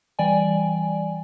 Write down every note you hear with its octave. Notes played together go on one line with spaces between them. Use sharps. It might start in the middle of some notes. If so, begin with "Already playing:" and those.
E3 G3 D5 G5 G#5